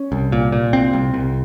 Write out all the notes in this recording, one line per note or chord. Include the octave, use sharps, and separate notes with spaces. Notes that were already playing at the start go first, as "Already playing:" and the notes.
Already playing: C#4
C2
A#2
A#2
C2 C4
C2
C2